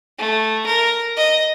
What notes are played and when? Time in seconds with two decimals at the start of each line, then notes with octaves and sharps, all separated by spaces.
0.19 A3
0.67 A#4
1.17 D#5